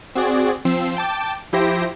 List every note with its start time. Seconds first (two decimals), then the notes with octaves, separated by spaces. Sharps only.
0.15 C4 F#4 G#4 D5
0.65 F3 C4 E6 C7
0.97 G5 A5 D6
1.53 F3 E4 G4 C5 A#6 D7